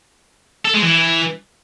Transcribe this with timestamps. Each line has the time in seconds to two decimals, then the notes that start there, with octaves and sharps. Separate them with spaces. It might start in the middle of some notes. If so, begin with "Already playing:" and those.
0.65 A4
0.73 G#3
0.82 E3